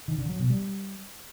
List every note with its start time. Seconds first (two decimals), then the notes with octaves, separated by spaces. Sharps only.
0.08 D#3
0.18 D3
0.29 F#3
0.39 B2
0.50 G3